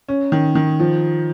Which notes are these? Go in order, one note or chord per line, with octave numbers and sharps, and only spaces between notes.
C#4
D#3
D#3
F3